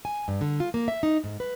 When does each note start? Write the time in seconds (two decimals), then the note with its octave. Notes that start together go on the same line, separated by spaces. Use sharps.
0.05 G#5
0.28 G2
0.41 D3
0.60 F4
0.74 A#3
0.88 E5
1.03 D#4
1.24 G#2
1.40 B4